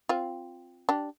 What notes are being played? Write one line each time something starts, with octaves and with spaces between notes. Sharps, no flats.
C4 F4
D4 G4